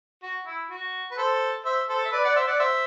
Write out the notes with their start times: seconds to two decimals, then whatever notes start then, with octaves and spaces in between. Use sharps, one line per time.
0.23 F#4
0.47 E4
0.70 F#4
1.11 B4
1.18 A4 C5
1.65 C5 E5
1.89 A4 C5
2.05 E5
2.12 B4 D5
2.24 D5 F#5
2.36 C5 E5
2.47 D5 F#5
2.60 C5 E5